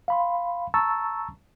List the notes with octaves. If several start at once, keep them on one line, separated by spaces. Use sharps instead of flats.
F5 B5 C6
A5 A#5 C#6 E6 A6